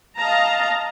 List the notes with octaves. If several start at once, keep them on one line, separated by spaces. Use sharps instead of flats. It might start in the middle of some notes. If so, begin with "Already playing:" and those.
D#5 F5 A5 A#5